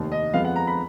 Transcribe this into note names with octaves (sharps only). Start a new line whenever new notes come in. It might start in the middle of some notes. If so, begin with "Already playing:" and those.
Already playing: F1 D#2 D#3
D#5
F2 F3 G#3 B3 F5
F#5
A#5
B5